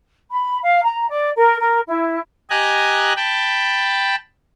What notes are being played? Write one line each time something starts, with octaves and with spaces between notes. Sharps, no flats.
B5
F5
A#5
D5
A#4
A#4
E4
G4 D#5 G#5 A#5 F#6
G5 A5 B5